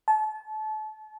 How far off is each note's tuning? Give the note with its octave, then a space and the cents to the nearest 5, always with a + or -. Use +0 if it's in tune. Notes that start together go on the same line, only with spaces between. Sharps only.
A5 -30